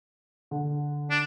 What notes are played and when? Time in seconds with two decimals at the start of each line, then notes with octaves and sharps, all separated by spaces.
0.51 D3
1.10 D4